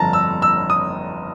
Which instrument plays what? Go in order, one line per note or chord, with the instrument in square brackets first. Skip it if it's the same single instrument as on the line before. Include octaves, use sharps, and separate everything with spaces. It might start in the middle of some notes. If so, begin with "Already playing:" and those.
Already playing: [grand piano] G1 F2 D3 A5 A#5
E6
E6
D#6